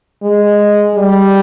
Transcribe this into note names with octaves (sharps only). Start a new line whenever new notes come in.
G#3
G3